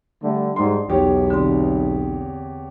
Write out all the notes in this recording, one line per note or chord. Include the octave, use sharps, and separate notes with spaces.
D3 G3 A3
G#2 G3 D4 C6
B1 E2 G4 C#5
D3 C4